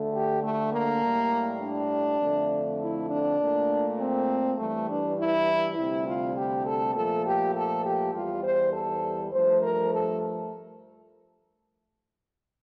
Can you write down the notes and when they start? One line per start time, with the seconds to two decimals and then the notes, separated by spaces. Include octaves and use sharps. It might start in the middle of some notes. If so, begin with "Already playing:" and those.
Already playing: D2 D3 A3
0.13 G4
0.43 A3
0.72 A#3
1.02 A2 G3
1.61 D4
2.20 F2 D3 A3
2.80 E4
3.09 D4
3.39 A#2 A3
3.98 C4
4.57 G2 E3 G3 A3
4.87 D4
5.17 E4
5.76 D2 C3 G3 E4
6.06 F4
6.35 G4
6.64 A4
6.94 A#2 F3 A3 A4
7.24 G4
7.54 A4
7.83 G4
8.13 E2 E3 G3 F4
8.43 C5
8.73 A4
9.31 G2 F3 A3 C5
9.61 A#4
9.91 A4